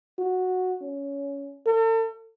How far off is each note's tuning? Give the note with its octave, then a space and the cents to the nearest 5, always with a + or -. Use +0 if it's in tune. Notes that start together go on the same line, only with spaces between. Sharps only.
F#4 -5
C#4 +15
A4 +40